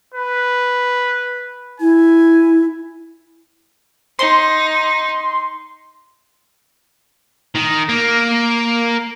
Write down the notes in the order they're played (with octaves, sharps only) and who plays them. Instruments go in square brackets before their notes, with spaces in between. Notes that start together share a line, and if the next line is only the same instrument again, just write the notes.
[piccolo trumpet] B4
[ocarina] E4 [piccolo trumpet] G#5
[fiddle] D#4 [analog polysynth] C6
[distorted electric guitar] D#3
A#3